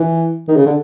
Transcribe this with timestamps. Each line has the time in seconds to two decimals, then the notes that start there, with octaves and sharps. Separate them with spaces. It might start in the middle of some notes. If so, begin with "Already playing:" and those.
Already playing: E3
0.48 D#3
0.56 C#3
0.66 D3